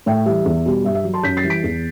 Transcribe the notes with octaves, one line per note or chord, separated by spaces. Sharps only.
A2 E5 G5
E3 G3 E5
E2
B2 G3
G2 E5
E5
F#3
A5 C6
F#2 G6 B6
A6 C7
E3 G3
B6 D7
E2